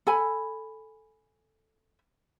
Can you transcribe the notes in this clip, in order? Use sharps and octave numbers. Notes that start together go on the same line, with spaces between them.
A4 G#5 B5